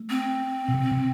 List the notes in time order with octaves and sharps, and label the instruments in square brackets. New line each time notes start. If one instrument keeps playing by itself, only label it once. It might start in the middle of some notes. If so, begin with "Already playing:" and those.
Already playing: [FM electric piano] A3
[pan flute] C4
[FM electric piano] B2
C3
C3